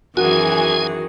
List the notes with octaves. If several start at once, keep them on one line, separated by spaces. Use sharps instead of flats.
F#2 D#3 E3 F#4 G#4 G#5